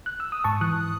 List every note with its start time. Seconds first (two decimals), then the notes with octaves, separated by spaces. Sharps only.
0.06 F#6
0.20 E6
0.32 D#6
0.44 G#2 A5 C#6
0.61 E3 D#6 F#6